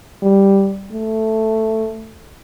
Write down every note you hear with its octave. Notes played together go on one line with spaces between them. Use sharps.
G3
A3